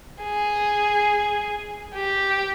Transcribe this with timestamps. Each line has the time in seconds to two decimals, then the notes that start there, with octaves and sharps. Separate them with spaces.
0.23 G#4
1.95 G4